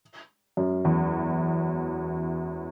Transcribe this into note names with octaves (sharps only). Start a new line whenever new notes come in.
F#2
E2